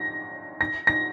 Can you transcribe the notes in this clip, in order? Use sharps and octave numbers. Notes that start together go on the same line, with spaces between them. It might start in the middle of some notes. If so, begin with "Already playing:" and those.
Already playing: A#6
A#6
A#6